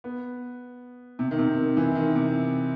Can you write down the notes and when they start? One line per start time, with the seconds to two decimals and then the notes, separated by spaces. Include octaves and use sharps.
0.04 B3
1.19 C3
1.31 D#3
1.39 C3
1.58 D#3
1.77 E3
1.95 D#3
2.15 C3